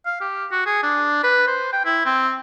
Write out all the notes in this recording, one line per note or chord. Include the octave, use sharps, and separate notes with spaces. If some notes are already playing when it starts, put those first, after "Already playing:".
F5
G4
F#4
G#4
D4
B4
C5
G5
E4
C4